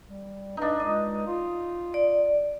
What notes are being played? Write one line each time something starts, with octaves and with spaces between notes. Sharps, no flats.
G3
G2 D4 D#4
C#2 D#5
F4
D5